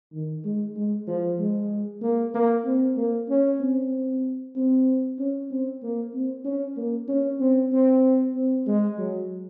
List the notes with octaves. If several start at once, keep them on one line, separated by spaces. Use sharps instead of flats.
D#3
G#3
G#3
F3
G#3
A#3
A#3
C4
A#3
C#4
C4
C4
C#4
C4
A#3
C4
C#4
A#3
C#4
C4
C4
C4
G#3
F#3